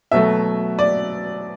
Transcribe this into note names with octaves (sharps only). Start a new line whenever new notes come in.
B2 F#3 A3 E5
D5